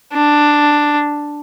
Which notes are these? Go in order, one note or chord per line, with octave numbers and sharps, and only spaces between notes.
D4